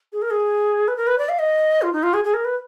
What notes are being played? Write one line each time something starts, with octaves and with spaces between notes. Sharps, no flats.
G#4
A#4
G#4
B4
A#4
B4
D5
F5
D#5
F4
D#4
F4
G#4
G#4
A#4
B4